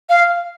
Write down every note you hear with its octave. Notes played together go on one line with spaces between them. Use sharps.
F5